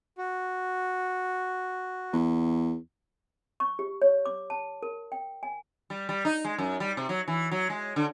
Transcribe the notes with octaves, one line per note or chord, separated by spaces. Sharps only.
F#4
E2
C#6
G4
C#5
D6
A5
A#4
G5
G#5
G3
G3
D#4
G#3
F#2
G3
C3
F#3
E3
F#3
G#3
D3